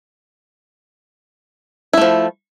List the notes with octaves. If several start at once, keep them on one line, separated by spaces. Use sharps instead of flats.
F3 A3 E4